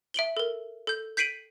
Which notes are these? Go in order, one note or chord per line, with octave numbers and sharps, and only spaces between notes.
E5 D7 F#7 G7
A4 A#4
A4 G6
G6 B6 C7 D7 D#7 F#7